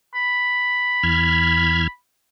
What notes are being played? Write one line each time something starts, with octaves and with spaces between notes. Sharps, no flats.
B5
E2 F6 G#6